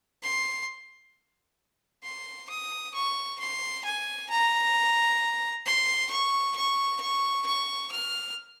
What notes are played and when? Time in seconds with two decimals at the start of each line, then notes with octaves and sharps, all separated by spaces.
0.23 C6
2.04 C6
2.50 D#6
2.94 C#6
3.40 C6
3.85 G#5
4.30 A#5
5.65 C6
6.10 C#6
6.56 C#6
7.00 C#6
7.46 C#6
7.92 F6